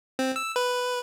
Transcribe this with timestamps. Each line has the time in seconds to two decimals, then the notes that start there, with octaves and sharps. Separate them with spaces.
0.19 C4
0.36 E6
0.56 B4